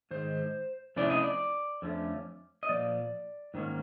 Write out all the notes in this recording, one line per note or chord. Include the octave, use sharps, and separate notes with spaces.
G#2 D#3 C5
C3 F3 A3 C#4 E4 D5
D#5
D5
F2 D3 F3 A3 C#4
D#5
A#2 F3 D5
G#2 D#3 F#3 A#3 C#4